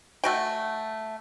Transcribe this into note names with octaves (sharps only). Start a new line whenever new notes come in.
A3 F#4 G5